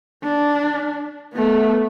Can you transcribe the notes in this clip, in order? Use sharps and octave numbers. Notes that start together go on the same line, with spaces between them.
D4
A3 B3